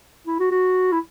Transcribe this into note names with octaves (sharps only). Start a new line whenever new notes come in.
E4
F#4
F#4
E4